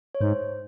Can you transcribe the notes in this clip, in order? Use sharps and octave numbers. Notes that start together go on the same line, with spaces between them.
C#5
G#2 C5